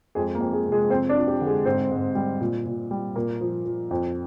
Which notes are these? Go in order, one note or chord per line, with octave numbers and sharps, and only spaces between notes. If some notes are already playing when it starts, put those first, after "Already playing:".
F2 G#3 G#4
A#3 A#4
F2
G#3 G#4
C3
G#3 G#4
F2 C4 C5
D4 D5
F3
G4
D3
G#3 G#4
G#2 C4 C5
G#2
G3
A#2
A#2
G3
A#2 A#3 A#4
F3
F3
F2